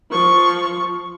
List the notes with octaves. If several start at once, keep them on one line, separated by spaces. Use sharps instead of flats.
F3 C#6